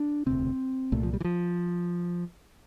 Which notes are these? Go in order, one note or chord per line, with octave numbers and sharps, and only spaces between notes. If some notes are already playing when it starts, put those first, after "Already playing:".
Already playing: D4
E1 D2 C3 C4
C2 A#2 A3
F3
G3
E3
F3